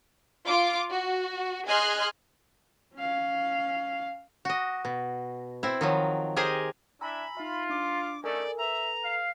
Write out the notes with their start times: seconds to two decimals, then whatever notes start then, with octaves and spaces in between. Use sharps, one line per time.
0.45 F4 D6
0.91 F#4
1.68 G#4 D#5 G#5 C6 F6 F#6
2.95 C#4 F5
4.45 F#4 D#5
4.85 B2
5.63 C4 E4
5.81 D#3 F3 F#3
6.36 G4 G#4 A#4 C5 D#5 G#5
7.01 D4 E4 E5 G#5 A#5 B5 E6
7.37 D#4 F4 E5
7.69 D4 D6
8.24 A3 C#4 D#4 A4 A#4 D5 G#5
8.58 A4 B4 E5 A#5
9.03 F5